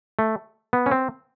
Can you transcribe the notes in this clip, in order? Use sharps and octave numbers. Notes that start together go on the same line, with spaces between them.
A3
B3
C#4
C4